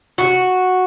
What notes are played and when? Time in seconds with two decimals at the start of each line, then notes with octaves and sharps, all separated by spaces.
0.18 F#4